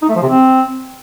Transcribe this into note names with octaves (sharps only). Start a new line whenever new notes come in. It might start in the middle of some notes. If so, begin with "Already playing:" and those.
D#4
A3
F3
C3
C4